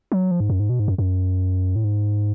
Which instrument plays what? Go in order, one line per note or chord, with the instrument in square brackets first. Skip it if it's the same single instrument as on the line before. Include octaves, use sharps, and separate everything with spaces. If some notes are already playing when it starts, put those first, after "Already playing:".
[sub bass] F#3
F3
G#2
F#2
G#2
B2
G#2
F#2
F#2
A2
G#2